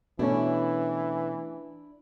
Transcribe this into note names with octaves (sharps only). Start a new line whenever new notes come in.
B2 E3 A3 C#4 D4 E4